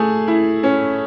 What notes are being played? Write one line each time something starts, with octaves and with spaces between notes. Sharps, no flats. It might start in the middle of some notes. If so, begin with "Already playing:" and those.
Already playing: A3 G#4
E4
C#4